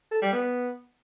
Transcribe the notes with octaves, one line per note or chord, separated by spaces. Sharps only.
A4
G3
B3